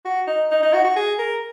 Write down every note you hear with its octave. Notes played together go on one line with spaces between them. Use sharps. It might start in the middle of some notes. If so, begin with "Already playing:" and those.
F#4
D#4
D#4
D#4
F#4
F#4
G#4
A#4